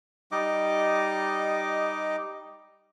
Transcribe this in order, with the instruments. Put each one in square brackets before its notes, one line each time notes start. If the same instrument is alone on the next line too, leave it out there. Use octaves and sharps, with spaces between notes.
[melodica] G3 D#4 D#5 D6